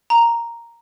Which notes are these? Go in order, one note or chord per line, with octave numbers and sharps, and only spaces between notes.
A#5